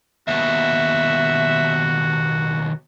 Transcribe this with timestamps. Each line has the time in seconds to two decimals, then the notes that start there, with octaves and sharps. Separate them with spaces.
0.28 D#2 B2 F#4 E5